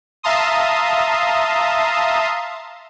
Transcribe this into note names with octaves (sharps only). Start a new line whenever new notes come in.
E5 F5 A5 A#5 C6 D#6